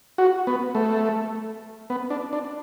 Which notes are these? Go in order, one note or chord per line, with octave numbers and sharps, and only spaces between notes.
F#4
B3
A3
B3
D4
D4